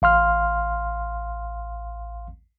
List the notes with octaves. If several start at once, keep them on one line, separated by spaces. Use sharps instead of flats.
A1 F5 C6 F6